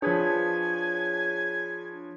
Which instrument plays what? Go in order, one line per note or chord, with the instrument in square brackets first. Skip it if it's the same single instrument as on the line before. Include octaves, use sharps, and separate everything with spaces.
[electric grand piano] F3 B4 C#5 [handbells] D4 G#4 G#6 [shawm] G#5